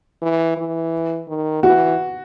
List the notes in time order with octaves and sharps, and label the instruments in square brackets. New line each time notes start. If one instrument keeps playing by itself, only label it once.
[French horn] E3
E3
D#3
[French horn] E3 [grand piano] F#4